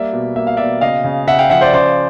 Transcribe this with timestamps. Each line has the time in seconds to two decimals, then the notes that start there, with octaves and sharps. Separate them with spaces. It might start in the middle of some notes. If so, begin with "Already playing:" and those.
Already playing: G3 A#3 D5 E5
0.13 B2
0.36 A#3 E5
0.47 F5
0.57 B2 D5 E5
0.81 C#3 D#5 F5
1.04 C#3
1.27 C#3 E5 F#5
1.39 F5 G5
1.50 F3 E5 F#5
1.61 C5 D5
1.73 C#3 C5 D5